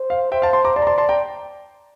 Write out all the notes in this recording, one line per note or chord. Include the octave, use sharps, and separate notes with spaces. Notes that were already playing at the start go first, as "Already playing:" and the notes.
Already playing: C5
F5
C5 E5 G5
F5 A5
A5 C6
A#5 D6
D5 A5 C6
A#5
A5 C6
A5 C6
G5 A#5